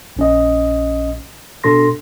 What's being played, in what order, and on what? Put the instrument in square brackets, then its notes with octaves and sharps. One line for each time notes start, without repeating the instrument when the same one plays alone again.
[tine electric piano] A#1 C#4 D#5
B2 D4 A4 C6 A#6